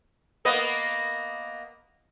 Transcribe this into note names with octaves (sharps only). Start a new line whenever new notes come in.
A#3 B3 D#5